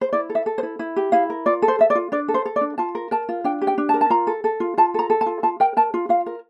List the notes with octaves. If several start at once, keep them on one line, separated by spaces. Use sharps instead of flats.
C5
E4 D5
A4
E5
A4
C5
E4
E4
G4
E4 F5
A#4
F4 D5
A4
C5
A4 E5
D5
F4
D4 D5
A4
C5
A4
D5
D4
F4 A5
A#4
A#4 A5
F4
D4 G5
G4
G5
D4
A5
A#4
A5
F4 A#5
A4
A4
F4
F4 A5
A4 A#5
A4
A5
F4
F4 A5
A#4 G5
A#4 A5
F4
F4 F5
A#4